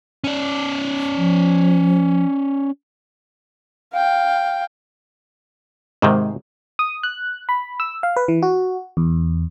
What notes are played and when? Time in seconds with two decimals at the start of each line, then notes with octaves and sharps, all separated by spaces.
0.24 C#4 D5
1.17 F3
3.93 F5 G5
6.02 G#2 C3 D#3 G#3
6.79 D#6
7.03 F#6
7.49 B5
7.80 E6
8.03 F5
8.16 B4
8.28 E3
8.43 F#4
8.97 E2